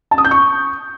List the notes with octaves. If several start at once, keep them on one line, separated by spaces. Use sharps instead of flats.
A5
D#6
G6
C#6